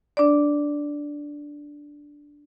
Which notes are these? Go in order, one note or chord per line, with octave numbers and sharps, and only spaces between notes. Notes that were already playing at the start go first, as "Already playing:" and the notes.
D4 D5